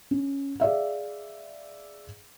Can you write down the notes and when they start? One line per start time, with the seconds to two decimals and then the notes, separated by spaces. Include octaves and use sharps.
0.11 C#4
0.60 G#4 D5 E5 F5